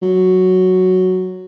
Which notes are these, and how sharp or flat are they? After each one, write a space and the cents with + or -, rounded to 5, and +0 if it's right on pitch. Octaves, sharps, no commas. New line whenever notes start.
F#3 +0